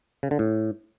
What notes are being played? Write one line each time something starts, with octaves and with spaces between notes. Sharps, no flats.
C#3
D3
A2